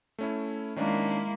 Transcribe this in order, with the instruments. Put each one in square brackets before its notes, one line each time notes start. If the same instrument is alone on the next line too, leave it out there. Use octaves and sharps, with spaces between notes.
[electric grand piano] A3 C#4 E4
[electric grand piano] D#3 C#4 D4 [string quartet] G#3 A#3 E4